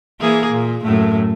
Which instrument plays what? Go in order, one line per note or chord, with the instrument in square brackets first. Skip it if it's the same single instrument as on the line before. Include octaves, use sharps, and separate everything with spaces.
[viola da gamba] E3 A#3 G#4
A#2
F#2 A2 A3